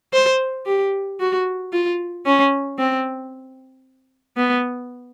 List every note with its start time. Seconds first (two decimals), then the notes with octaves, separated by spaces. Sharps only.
0.13 C5
0.66 G4
1.20 F#4
1.73 F4
2.26 C#4
2.79 C4
4.37 B3